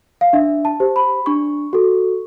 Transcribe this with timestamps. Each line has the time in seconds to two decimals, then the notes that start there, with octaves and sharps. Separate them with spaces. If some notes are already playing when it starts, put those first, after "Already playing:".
0.21 F5
0.33 D4 E5
0.65 A5
0.80 G4 C5
0.96 B5
1.26 D4 C#6
1.73 F#4 A4